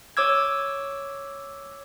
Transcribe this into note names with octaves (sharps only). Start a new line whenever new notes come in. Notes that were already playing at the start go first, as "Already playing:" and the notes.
C#5 D6 E6 G#6